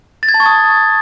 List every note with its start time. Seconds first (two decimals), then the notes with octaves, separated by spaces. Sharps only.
0.23 A6
0.29 G#6
0.34 A5
0.40 C#6
0.46 D#6